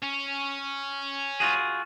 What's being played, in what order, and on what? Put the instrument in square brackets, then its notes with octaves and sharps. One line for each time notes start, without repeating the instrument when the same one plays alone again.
[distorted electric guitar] C#4
[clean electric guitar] F4 F#4 G#4